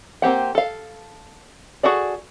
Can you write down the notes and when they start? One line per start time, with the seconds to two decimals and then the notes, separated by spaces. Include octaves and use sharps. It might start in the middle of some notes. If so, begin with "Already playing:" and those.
0.22 A#3 C4 G4 F#5
0.55 A4 F5
1.83 F#4 G#4 A4 D5